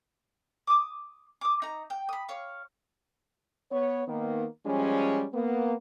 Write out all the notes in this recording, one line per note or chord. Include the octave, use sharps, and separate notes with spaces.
D6 D#6
D6 D#6
D#4 A#5
G5
B5 D#6
C#5 F5
B3 C#5
D#3 A#3 B3
F3 G3 G#3 C#4
A#3 B3